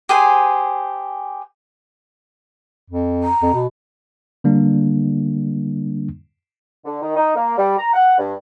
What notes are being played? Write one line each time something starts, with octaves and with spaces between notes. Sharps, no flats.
G4 G#4 C5 G#5
F2
A#5
F2
B2
D3 G3 A#3 D4
D3
D#3
D#4
A#3
G3
A#5
F#5
G2